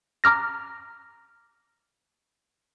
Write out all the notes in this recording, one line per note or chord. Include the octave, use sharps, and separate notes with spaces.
A#5 D6 F6 A#6